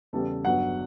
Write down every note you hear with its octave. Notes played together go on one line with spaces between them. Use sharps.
E2 C#3 E3 G3 A4
G1 G2 F#3 F#5